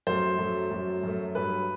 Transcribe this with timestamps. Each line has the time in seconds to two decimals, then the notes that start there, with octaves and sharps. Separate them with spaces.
0.07 F#2 F#3 A3 C5
0.38 F#2 F#3 A3
0.71 F#2 F#3 A3
1.03 F#2 F#3 A3
1.35 G2 F#3 A3 B4